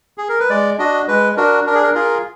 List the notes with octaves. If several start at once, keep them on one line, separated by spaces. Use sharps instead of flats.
G#4
A#4
B4
G#3 D5
D4 F#4 D#5
G#3 B4
D4 F#4 A#4
D4 A#4
G#4
A#4
F4 G#4 A#4